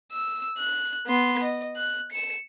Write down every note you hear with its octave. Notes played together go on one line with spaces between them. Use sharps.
E6
F#6
B3 C6
D#5
F#6
C#7 E7